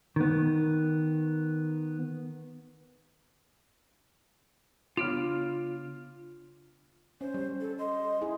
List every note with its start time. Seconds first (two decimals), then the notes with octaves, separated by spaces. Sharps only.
0.16 D#3 B3
4.97 C#3 B3 D4 F4 F6
7.21 C#4 C5
7.34 G3
7.61 A4
7.79 D#5 C6
8.22 E4 G#4